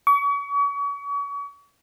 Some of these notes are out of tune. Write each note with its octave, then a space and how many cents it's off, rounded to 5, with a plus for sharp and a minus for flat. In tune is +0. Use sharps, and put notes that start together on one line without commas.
C#6 +40